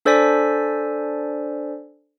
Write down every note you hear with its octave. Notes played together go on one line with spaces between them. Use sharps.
D4 A4 C5 D5 G#5 B6